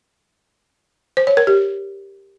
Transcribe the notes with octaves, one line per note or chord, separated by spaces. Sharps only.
C5
C#5
A#4
G4